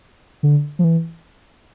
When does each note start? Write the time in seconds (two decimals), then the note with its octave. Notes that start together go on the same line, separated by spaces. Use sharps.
0.43 D3
0.79 F3
0.84 E3